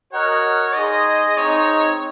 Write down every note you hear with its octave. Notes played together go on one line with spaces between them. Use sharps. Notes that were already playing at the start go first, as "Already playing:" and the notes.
F#4 A#4 C#5 D#5 F#5
D#4 G#4 C5 D#5
G#3 C4 D#4 C#5